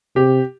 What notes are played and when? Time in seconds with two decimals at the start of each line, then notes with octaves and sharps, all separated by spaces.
0.16 C3 G4